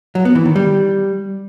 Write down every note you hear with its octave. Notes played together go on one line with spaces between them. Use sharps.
F#3
B3
E3
D#3
G3